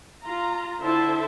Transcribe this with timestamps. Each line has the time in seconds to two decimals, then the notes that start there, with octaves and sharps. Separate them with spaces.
0.24 F4 A#5
0.81 D3 E4 C5 E5 A5